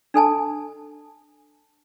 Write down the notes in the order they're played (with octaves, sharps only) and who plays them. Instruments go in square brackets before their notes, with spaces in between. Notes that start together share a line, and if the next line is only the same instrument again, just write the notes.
[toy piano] D4 A4 G#5 A5